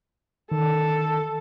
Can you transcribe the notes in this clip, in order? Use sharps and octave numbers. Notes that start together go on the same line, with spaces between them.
D#3 A4